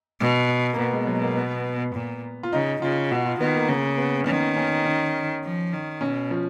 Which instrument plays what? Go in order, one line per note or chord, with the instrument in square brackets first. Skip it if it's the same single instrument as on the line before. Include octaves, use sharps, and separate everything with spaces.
[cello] B2
[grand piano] A#3
[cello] B2 [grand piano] B3
[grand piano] G#3
F#3
A#3
B3
[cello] A#2
[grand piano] F4
[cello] C#3 [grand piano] D#4
[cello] C#3 [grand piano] F4
[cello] B2 [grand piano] F#4
[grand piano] F4
[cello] D#3 [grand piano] B3
[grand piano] A#3
[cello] C#3 [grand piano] A#3
[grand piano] B3
[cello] D#3 [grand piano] C#4
[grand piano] C#4
C#4
[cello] F3
D#3
[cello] B2 [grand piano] C#4
[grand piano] F3